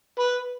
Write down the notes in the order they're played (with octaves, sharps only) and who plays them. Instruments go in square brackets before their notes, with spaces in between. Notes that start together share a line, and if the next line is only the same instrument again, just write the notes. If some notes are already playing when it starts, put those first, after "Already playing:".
[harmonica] B4